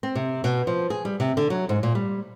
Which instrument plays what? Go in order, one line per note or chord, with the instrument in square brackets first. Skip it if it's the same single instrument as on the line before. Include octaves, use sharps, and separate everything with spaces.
[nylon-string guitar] C4
C3
B2
F3
G#4
G3
C3
D3
F#3
G#2
A#2
G3